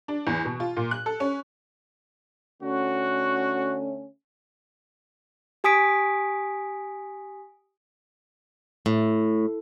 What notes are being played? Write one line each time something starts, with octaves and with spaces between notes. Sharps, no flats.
D4
E2
B2
F4
A#2
F#6
A4
C#4
D3 A3 C#4 F#4
G4 G#5 D#6 B6 D7
A2